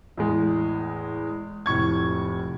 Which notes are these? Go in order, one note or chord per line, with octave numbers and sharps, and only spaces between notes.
E2 A2 G#3
F1 A2 C#6 G#6